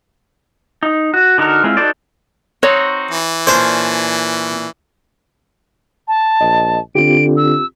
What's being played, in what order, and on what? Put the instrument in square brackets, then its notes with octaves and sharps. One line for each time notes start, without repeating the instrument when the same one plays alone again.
[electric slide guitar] D#4
F#4
D3 D#4 F#4 A#4
G#3 C4 E4 F4
D#4 F#4 G4 A4 C5 D5
[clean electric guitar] C4 D#4 F#4 [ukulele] C#5
[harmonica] E3
[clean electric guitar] A#2 C#4 D4 [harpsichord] C5
[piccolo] A5
[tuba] A#1 [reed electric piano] D#5
[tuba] D3 [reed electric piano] C4 F4 G4 [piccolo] D7
[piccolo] E6